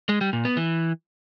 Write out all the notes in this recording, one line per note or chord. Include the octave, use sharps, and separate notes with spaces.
G#3
G3
A#2
B3
E3